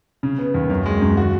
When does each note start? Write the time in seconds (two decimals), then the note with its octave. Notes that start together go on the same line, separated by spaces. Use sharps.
0.23 C#3
0.39 B3
0.54 D#2
0.70 F#2
0.86 G#3
1.01 F#2
1.17 F#4